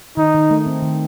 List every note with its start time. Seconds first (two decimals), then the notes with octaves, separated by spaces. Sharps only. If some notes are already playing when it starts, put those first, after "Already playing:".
0.17 D#3 D#4
0.34 D#3
0.50 A3
0.66 C4
0.82 D#3